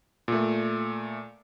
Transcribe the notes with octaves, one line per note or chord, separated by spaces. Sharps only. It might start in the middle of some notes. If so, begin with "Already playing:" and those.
A#2 A3